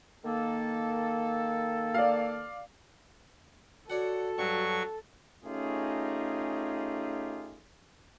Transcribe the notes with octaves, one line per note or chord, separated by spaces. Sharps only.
D#3 A#3 A4
D5 F5
F#4 A4 C#5 D5 F#5
G2 F#3 C#6
A3 C#4 D#4 F4 G4 G#4